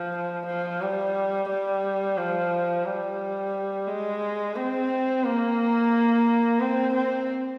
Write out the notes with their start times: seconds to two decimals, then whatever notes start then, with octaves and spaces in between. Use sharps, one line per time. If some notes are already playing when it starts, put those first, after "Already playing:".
Already playing: F3
0.47 F3
0.81 G3
1.49 G3
2.18 F3
2.86 G3
3.88 G#3
4.56 C4
5.24 A#3
6.60 C4
6.94 C4